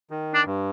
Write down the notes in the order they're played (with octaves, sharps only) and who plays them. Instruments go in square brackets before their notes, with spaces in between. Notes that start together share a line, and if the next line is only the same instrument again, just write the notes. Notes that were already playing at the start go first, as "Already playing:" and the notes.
[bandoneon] D#3
[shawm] D4
[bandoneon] G2